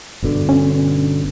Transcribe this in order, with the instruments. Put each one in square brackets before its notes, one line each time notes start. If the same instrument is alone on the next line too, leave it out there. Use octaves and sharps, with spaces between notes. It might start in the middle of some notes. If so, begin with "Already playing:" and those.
[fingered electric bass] G1 B2 D3
[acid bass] C#4